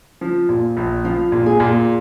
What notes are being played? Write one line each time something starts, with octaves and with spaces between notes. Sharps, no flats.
F3
A#2
A#1
F3 F4
A#2
G#4
A#2